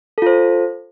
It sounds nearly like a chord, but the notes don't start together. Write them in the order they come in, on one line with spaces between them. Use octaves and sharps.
A4 F4 C5